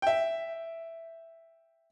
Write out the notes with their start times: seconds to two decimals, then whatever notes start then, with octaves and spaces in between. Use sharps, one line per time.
0.02 E5 G5